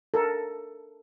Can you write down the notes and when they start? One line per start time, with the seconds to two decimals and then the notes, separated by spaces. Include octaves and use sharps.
0.14 A4 A#4